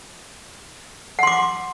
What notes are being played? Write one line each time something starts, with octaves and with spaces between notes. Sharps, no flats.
F#5 C6 D6